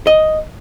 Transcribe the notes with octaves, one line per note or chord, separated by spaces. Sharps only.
D#5